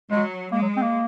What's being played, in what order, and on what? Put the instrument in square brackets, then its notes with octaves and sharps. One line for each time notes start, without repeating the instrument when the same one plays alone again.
[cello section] F#3 [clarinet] G#3
[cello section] G#3 [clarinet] A#3
[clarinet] F#3
C4
A#3